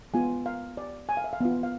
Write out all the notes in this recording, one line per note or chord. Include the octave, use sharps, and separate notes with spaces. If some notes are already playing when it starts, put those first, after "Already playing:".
G#3 B3 F4 G#5
F5
D5
G#5
F5
E5
F5
B3 F4
F5